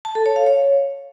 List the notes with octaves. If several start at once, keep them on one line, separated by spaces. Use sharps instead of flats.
A5
A4
C#5
F5
C#5